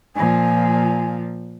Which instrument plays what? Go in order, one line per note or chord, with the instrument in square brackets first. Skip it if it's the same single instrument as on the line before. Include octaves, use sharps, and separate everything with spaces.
[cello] A#2 F3 [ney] G#5